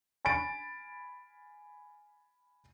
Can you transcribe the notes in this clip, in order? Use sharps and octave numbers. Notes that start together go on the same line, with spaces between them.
G#5 B5 A6 D7